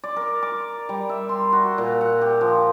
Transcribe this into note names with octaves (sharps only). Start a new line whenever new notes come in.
D5
A#4
D6
G3
E5
C6
F#4
A#2
F#5
G4
F3